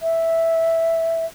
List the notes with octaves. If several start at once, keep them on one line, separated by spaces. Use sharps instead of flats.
E5